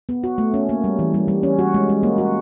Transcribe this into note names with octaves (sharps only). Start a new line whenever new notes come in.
B3
F#4
A3
C#4
A#3
G3
E3
G3
G3
C#4
F#4
G#3
G#3
A#3
F#4